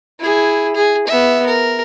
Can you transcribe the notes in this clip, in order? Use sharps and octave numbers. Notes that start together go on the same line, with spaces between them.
E4 G#4
G#4
B3 E5
A#4